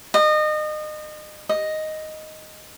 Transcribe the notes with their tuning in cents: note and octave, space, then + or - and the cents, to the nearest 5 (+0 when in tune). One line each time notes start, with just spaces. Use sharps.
D#5 -30
D#5 +0